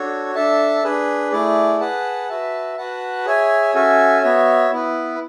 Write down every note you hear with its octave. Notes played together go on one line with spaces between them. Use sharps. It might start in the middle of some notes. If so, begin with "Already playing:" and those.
Already playing: D4 F#4 A4 C#5
D4 A4 E5 A5
D4 G#4 B4
A3 E4 G#4 D5
G#4 B4 F#5 A5
F#4 B4 E5 A5
F#4 B4 F#5 A5
G#4 C#5 E5 G#5
C#4 F#4 A4 E5 G#5
B3 F#4 C#5 E5
B3 E4 B4